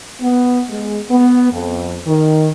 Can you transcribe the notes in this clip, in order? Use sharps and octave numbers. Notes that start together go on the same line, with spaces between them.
B3
G#3
B3
F2
D#3